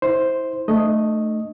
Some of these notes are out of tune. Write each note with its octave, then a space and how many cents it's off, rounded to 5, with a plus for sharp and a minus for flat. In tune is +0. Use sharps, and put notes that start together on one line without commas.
E4 -30 C5 +0
A3 +0 D4 +40 D#5 +0